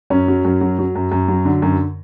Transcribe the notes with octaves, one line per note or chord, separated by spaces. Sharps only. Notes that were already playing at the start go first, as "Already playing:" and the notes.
F#2 C#4
F#3
F#2
F#3
F#3
F#2
F#2
F#3
D3
F#2